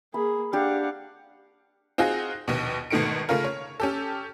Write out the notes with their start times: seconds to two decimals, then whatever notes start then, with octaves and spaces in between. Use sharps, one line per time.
0.14 A#3 G#4 B5
0.53 D4 G4 F5 F#5
1.98 C4 D#4 F4 F#4 G#4
2.48 A#1 D#2 B2
2.90 G#1 B2 D#3 A3 C#7 D7
3.29 C#3 A3 C#4 F4 A#4
3.44 C#5
3.80 C#4 G4 A4